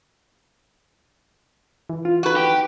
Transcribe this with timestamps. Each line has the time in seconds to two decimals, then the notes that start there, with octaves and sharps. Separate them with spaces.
1.90 E3
2.05 F4
2.23 D#4 F#4 B4
2.36 G4